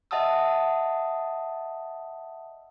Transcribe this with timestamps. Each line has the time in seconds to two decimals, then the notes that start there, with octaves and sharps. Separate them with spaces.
0.11 D#5 E5 F#5 A5 D#6 E6